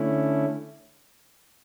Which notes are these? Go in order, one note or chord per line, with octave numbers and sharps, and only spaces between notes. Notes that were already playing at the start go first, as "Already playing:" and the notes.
Already playing: D3 A3 C#4 E4